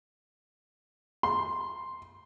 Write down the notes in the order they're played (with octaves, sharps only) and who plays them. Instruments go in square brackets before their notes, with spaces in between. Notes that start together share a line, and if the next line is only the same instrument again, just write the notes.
[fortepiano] C6